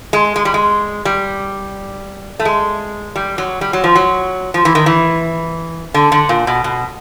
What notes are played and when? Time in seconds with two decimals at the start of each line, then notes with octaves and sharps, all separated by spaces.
0.13 G#3
0.36 G#3
0.45 G3
0.54 G#3
1.05 G3
2.39 A3
2.45 G#3
3.16 G3
3.38 F#3
3.61 G3
3.73 F#3
3.84 F3
3.95 F#3
4.54 F3
4.65 E3
4.75 D#3
4.86 E3
5.94 D3
6.12 D3
6.29 A#2
6.47 B2
6.64 B2